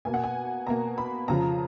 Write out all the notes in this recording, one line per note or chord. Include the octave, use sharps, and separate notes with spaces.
B2 A#3 G#5
F#5
G#5
B2 A#3 A#5
B5
F2 C#3 F3 A#5